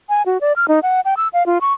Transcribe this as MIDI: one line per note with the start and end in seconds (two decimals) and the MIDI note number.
0.09 0.23 80
0.26 0.40 66
0.41 0.53 74
0.56 0.65 89
0.68 0.79 63
0.83 1.00 78
1.05 1.14 79
1.17 1.28 88
1.33 1.46 77
1.46 1.58 65
1.61 1.73 85